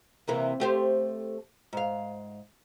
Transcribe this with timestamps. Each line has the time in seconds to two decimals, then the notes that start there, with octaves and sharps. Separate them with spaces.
0.28 C3 E3 A#3
0.60 A3 G4 C5
1.73 G#2 F5